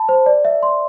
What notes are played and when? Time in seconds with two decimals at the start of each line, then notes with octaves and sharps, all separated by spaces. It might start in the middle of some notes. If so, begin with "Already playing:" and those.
Already playing: A5 B5
0.09 C5
0.26 D5
0.45 E5
0.63 C6